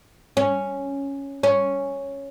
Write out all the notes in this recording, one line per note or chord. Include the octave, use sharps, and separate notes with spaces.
C#4
C#4